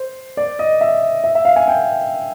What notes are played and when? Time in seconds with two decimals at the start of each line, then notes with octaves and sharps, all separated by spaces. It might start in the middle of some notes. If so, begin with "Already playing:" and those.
Already playing: C5
0.37 D5
0.59 D#5
0.81 E5
1.24 E5
1.35 E5
1.45 F5
1.56 G#5
1.68 G5